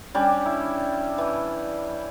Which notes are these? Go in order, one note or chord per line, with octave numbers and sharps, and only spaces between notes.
G3 C#4 D4
E4
E3